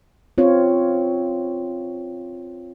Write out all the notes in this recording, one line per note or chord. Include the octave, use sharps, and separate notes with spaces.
C4 F4 C#5